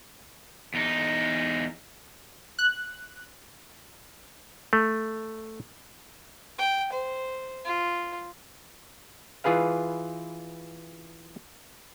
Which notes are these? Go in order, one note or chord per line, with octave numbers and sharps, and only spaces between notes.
E2 D#4
F#6
A3
G5
C5
F4
E3 F4 G#4 B4 F5